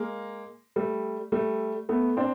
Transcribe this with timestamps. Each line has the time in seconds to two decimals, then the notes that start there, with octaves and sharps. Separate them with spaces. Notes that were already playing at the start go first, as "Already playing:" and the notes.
Already playing: G#3 A#3
0.76 G3 A3
1.32 G3 A3
1.89 A3 B3
2.17 C4 D4